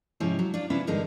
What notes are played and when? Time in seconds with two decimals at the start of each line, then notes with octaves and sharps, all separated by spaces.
0.20 G#2 C3 F3 C#4 E4
0.39 F#3
0.54 D4 F4
0.70 C3 B3 C#4 D4 E4
0.87 E2 G2 D3 G#3 D#4 A#4